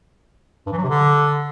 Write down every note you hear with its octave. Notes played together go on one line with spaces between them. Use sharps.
G2
E3
F#3
C3
D3